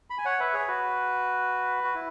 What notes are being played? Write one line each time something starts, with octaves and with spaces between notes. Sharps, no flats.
B5
G#5
C#5 F#5
B4 E5
G#4 C#5
F#4 B4
F#4
E4